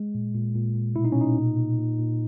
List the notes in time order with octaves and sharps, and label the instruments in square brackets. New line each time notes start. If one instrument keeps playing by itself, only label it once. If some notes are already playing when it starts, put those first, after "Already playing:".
Already playing: [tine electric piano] G#3
A#2
A#2
A#2
A#2
B2 E4
D#4
C#4
B2
D#4
A#2
A#2
A#2
A#2